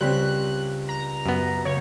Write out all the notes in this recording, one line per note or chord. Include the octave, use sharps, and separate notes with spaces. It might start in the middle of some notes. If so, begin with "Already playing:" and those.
C#2 G3 C4 C6 F#6 B6
A#5
F#2 B3
C#2 C#5